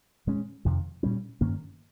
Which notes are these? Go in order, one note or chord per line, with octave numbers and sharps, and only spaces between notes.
A#2 G#3 C#4
F2 C3 D#3
A#2 G3 C#4
G2 D#3 A#3 C#4